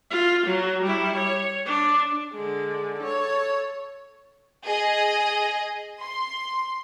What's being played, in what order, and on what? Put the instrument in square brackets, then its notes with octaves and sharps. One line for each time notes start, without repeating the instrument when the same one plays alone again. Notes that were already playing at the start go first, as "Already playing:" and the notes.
[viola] F4
F#3
G3 E4
C#5
D4
D3 G#3
A4 C#5
[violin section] G#4 D#5
C6